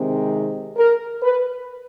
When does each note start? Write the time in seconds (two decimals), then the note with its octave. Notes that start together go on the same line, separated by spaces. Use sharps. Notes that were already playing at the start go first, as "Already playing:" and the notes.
Already playing: C3 D#3 G#3 C4
0.77 A#4
1.22 B4